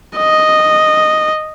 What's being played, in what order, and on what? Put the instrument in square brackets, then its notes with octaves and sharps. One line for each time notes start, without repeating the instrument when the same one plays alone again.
[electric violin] D#5